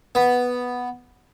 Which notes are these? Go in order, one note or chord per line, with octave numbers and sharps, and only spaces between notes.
B3